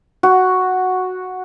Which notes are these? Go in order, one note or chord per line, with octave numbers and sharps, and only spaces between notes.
F#4